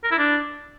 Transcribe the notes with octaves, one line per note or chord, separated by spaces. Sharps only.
A#4
E4
D4